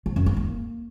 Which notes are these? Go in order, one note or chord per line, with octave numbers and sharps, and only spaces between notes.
F3
F#2
B3
A#3